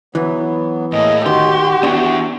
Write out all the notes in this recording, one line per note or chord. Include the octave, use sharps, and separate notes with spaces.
E3 F#3 B3
A2 A#3 G#4 D#5
D#3 F#4 G4 C6
B3 D4 E4